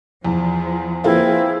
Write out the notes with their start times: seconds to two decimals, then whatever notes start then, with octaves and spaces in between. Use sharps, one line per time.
0.25 E2 F3
1.04 A#3 C4 E4 F4 G#4 B4